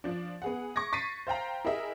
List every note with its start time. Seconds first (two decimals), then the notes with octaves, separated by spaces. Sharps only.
0.04 F3 D4
0.42 B3 G#4 F#5
0.76 C#6 D6 G#6 A#6
0.93 C#6 A6 B6 C7 D#7
1.27 C5 F5 G5 A#5
1.65 E4 G4 G#4 A#4 D#5 E5